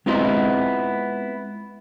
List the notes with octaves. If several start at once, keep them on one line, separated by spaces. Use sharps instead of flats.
G#3 B3 C4 E4 F4 D#5